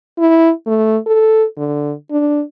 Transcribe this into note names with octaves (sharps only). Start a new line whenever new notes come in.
E4
A3
A4
D3
D4